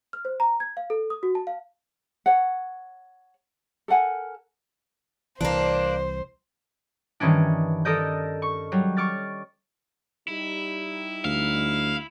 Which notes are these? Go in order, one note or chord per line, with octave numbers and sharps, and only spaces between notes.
F6
C5
A#5
G#6
F5
A4
D#6
F#4
A5
F5
C#5 F#5
A4 A#4 F#5 G#5
C2 E3 A#3 D4 C5
G2 D#3 E3 C#4 D4
A4 A#4 D5 D#5 G6
C#6
F#3 G3
C#6 D6 F6 A6
G3 D#4 E4
D2 F5